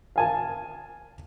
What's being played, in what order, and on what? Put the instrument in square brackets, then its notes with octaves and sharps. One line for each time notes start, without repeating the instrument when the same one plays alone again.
[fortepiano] F5 G#5 A5